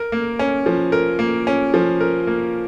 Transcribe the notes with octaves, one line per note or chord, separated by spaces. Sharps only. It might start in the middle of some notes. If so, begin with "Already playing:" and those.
Already playing: A#4
A#3
C#4
F3
A#4
A#3
C#4
F3
A#4
A#3